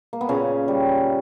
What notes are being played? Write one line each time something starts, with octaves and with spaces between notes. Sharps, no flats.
A#3
B3
A#2 C#3 C#4
G3